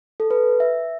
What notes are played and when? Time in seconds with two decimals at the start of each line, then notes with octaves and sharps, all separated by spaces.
0.20 A4
0.31 B4
0.60 E5